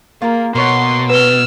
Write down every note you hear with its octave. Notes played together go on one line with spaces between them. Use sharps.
A#3 F4 G#4 A#4
B2 A#3 C#5 F#5 C6
B4 E6 F6 G7